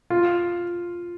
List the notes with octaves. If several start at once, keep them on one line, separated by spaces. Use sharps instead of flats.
F4